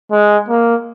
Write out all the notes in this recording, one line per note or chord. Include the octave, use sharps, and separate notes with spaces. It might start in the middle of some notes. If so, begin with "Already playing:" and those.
G#3
A#3